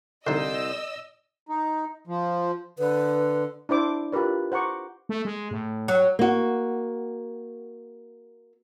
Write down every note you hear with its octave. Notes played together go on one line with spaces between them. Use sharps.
C2 D3 D#4 C5 D5 D#5 E6
D#4
F3
D3 B4
D4 E4 C5 D6
F4 G4 A#4 B4 D5
C5 F#5 A#5 C#6 D6
A3
G#3
A2
F#3
A#3 F#4